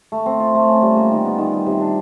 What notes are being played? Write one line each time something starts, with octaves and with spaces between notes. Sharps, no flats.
A3
C4
F4
A3
C#4
G3
A#3
D#3
B3
D#3
G3
C3
D4